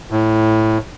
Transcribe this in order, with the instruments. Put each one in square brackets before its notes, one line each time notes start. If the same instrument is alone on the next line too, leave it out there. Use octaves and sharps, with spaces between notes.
[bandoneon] A2